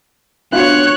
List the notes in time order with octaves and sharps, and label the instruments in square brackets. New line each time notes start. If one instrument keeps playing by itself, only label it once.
[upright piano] B3 F4 F#4 [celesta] D4 [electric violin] C#5 F#6